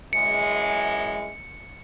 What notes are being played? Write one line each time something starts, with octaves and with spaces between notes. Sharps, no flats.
F#2 E3 G#3 C#7